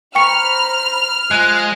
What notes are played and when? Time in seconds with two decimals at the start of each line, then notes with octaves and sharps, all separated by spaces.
0.15 C5 G5 A#5 B5 C#6 F6 C#7
1.31 G#3 F4 C5 F#6